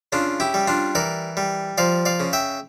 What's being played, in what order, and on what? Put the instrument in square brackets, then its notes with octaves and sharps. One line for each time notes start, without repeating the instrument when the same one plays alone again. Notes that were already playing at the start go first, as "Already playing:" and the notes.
[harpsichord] C#3 D4 F4
E4 G4
G3
D4 F4
E3 A#4 D5
G3
F3 D5 F5
D5 F5
C#3
E5 G5